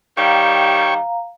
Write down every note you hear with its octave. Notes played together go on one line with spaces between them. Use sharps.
D#3 G3 C#5 F5 G5 A#5 C#6